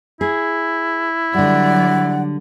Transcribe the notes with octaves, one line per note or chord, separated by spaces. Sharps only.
E4 G#4
D3 F#3 G3 D5 F#5